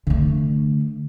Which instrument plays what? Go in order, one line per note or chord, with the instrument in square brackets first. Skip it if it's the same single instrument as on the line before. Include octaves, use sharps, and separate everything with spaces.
[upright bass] D3 A3